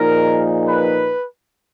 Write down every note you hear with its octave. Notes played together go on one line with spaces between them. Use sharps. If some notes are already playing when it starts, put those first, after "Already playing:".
Already playing: A#2 F3 A#3 D#4 G#4 A#4
B4